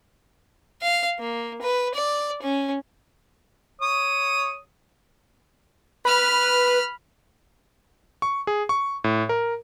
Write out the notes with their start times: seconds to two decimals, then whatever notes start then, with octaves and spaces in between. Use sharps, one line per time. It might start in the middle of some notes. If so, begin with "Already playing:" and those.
0.82 F5
1.19 A#3
1.62 B4
1.95 D5
2.42 C#4
3.81 C#5 D#6
6.05 B4 B5 F6
8.22 C#6
8.47 G#4
8.69 C#6
9.04 A2
9.29 A#4